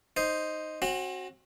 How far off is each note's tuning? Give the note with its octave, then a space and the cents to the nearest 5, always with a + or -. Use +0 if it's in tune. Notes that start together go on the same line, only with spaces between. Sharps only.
D#4 +0 C5 +0
C4 +40 F#4 +0